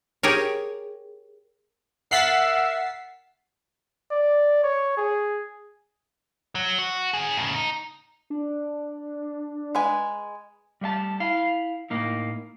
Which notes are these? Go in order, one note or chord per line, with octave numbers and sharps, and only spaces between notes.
G4 G#4 A#4 C#5
A#4 E5 F#5 A6 B6 C7 F#7
D5
C#5
G#4
F#3
F#4
D#3 G#4
A2 C#3
D#4
D4
G#3 B4 G#5
G3 A3 E5 A5
E4 F5
A2 A#3 D#4